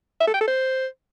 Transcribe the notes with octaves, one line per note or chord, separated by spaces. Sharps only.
E5
A4
G5
A4
C5